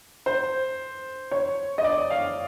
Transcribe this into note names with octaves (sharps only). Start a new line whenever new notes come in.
C5
C#5
D#5
D5
F5